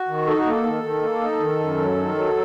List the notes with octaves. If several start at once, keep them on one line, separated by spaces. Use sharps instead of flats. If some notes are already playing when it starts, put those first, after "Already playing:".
Already playing: F#4
D#3
D#4 A4
F#4
A#3 A4
D#3
D#3
A#3
D#4
D#3
F#2
F#3
D#3
F#3